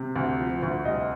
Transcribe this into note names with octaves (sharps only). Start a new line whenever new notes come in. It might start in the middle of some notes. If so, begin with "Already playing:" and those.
Already playing: C3
D2
F3
D2
C2 D#5